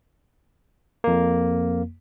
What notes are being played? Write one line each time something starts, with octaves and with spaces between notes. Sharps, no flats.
F2 A#3